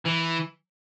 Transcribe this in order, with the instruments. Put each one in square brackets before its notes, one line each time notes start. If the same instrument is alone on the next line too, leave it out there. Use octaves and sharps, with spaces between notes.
[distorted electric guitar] E3